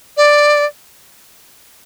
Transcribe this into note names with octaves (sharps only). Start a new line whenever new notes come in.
D5